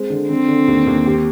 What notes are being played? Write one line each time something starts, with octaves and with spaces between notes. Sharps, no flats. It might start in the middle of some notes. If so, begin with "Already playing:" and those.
Already playing: G#3 C4
D3
D3 C4
D3
D#2
D#2
G4